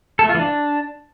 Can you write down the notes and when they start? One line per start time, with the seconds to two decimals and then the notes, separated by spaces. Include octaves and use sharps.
0.19 A4
0.24 A3
0.29 F4
0.34 E3
0.39 D4